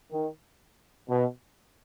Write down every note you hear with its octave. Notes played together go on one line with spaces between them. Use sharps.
D#3
B2